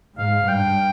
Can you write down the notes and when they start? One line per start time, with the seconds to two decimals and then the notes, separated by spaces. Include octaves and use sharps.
0.18 G#2 F5
0.47 G2 G5